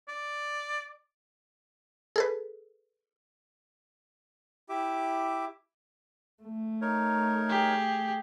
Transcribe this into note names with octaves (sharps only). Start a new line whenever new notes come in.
D5
G#4 A4 B4
E4 G4 E5 D6
A3
D#4 A#4 C#5
G4 G#4